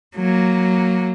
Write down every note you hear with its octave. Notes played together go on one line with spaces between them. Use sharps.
F#3 A#3